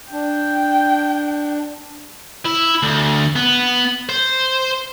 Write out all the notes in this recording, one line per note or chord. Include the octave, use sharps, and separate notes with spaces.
D4 G5
E4
D2
B3
C5